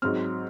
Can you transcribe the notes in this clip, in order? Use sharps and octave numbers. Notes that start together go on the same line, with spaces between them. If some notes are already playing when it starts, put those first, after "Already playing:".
G#2 F#3 C4 F6